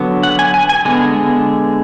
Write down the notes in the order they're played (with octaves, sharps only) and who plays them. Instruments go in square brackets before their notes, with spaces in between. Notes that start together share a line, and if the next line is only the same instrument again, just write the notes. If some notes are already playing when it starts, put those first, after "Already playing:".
Already playing: [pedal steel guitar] D3 F#3 B3
F#5
G#5
G#5
G#5
D3 G#3 B3